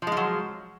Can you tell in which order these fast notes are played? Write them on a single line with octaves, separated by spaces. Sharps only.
F3 G#3 F4 F#3